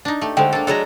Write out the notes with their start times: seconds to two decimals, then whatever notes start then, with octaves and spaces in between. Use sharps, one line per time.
0.05 D4 D#4
0.21 A3 G4
0.37 D3 G#3 A3 C5 G5
0.53 A#3 D4 A4
0.67 F#3 G#3 D4 A4 A#5